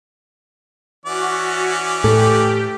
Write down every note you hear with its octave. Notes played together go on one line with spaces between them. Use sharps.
E3 C#4 F#4 D5
A2 G4 A4